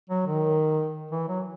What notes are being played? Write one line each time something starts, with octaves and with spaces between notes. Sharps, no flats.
F#3
D#3
E3
F#3